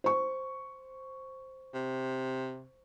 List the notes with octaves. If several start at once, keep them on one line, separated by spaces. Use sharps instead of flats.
C5 C#6
C3